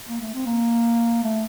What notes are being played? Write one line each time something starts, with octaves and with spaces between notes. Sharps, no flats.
A#3
A3
C4
A#3
A3